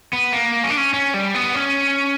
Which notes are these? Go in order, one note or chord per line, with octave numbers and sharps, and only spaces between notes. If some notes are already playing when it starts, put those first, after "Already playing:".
B3
A#3
C#4
D4
C#4
C#4
G3
B3
C#4